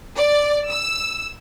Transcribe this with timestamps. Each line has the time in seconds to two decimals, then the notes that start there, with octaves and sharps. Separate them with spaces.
0.17 D5
0.68 E6